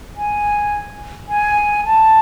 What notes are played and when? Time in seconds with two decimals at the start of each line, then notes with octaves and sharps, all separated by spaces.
0.17 G#5
1.29 G#5
1.85 A5